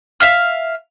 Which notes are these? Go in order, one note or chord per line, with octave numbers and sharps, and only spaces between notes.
E5 F5 F6